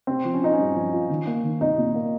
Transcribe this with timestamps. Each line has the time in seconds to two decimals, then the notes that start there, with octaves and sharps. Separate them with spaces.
0.07 C3 C4
0.25 F3
0.34 C#4
0.42 D#4 F4
0.53 G2 C#4
0.76 F3
0.92 F4
1.10 D#3
1.26 A#3
1.44 D#3
1.60 C2 D#4
1.78 A#2
1.95 A#3